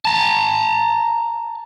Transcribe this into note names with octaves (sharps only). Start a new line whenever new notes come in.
A5 A#5